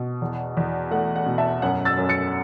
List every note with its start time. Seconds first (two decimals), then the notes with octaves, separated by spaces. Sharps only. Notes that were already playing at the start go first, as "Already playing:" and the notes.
Already playing: B2
0.22 E2
0.57 E2
0.91 A3 F#5
1.16 F#5
1.26 B2
1.38 E5 A5
1.62 F#2 F#5
1.85 E6 A6
1.97 F#2
2.09 A6 C#7